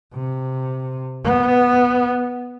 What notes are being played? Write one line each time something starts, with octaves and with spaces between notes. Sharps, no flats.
C3
B3